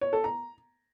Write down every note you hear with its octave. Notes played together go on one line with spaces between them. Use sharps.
C#5
A4
A#5